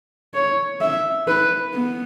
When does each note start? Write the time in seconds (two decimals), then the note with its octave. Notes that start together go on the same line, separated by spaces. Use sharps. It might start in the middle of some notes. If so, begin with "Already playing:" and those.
0.34 C#5
0.81 E5
1.28 B4
1.74 B3